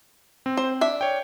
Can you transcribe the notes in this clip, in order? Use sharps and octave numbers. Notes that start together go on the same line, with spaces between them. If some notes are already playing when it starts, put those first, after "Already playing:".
C4
C5
D4 E5
C#5 G5